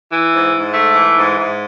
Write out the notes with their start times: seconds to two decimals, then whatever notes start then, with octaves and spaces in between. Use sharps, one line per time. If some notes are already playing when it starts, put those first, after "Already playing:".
0.12 E3
0.34 G#2
0.54 G#2
0.74 A3
0.95 E3
1.16 G#2
1.37 G#2